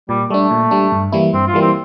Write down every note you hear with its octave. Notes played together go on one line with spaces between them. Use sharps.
A#2 G3
G3 A3 D4
A#2
G3 D4
G2
E3 G3 A#3 E4
G2 C4
F4
E3 G3 A#3 E4
C4